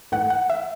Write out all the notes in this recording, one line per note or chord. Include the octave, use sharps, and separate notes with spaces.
G#2 E3 A3 F#5
F#5
E5